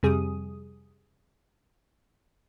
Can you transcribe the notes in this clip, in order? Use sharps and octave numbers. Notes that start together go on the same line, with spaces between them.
F2 C3 G3 G#4 D#6